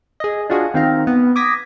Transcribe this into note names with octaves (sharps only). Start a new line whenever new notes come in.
G#4 D#5
D4 F4 F#4 G#4
D#3 C4 D#4 F5 A#5
B3
D6 D#6 G#6 A#6 B6